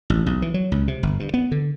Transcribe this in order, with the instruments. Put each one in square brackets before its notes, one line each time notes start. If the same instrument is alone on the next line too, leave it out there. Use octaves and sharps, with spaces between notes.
[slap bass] A1
B1
E3
F#3
C#2
C3
G1
G2
B3
D3